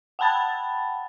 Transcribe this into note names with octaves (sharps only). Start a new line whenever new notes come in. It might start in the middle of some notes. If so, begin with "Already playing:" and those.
F#5 G5 A5 B5 A6